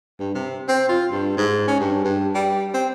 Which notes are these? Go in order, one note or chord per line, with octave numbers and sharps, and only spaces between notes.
G2
C3
C4
F4
G2
G#2
C#4
G2
G2
G3
C4